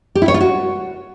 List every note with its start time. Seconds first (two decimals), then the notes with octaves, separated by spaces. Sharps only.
0.15 G4
0.22 E4
0.28 C#5
0.34 F4
0.41 F#4